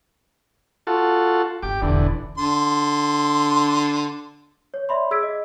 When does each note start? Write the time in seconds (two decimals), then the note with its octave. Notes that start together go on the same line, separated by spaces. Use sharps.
0.87 F4 F#4 A4
1.63 G1 C2 G4 D6
1.82 E1 A#1 E2 D3
2.38 D3 C6
4.74 C#5
4.89 C#5 D5 E5 B5 C6
5.11 G#4 E6 G#6 B6 D7
5.23 D#5